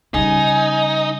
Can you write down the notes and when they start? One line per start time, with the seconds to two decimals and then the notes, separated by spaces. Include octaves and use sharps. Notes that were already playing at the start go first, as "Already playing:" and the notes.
0.14 C#3 G3 D#4 G#5